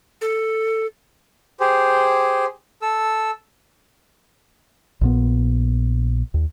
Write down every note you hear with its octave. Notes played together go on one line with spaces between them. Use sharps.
A4
G4 G#4 C5
A4 E6
A#1 A#2 B3
D#2